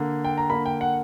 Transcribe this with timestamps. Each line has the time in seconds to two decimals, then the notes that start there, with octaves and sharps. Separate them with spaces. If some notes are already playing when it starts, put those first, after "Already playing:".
Already playing: D3 A#3
0.24 G5
0.38 A#5
0.50 D3 A#3 B5
0.66 G5
0.81 F#5